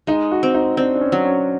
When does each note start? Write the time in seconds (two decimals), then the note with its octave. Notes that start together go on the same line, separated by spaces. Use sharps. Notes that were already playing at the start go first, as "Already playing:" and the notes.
0.07 G#3 D#4
0.31 F#4
0.43 C4
0.54 D#4
0.77 C4 D4
0.95 D4
1.01 C#4
1.12 F#3
1.25 C#4